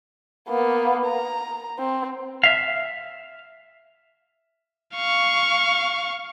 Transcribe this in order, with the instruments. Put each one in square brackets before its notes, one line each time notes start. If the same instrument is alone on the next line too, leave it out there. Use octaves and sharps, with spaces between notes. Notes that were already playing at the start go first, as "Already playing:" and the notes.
[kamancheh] A#3 B3
A#5
C4
[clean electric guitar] E5 F5
[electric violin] F5 C#6